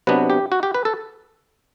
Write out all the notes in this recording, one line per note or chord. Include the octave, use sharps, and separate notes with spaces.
C3 F#3 B3 D4 B4
G4
F#4
G4
B4
A4